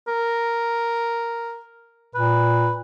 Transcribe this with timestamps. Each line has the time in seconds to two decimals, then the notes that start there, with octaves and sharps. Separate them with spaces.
0.08 A#4
2.15 A#2 B4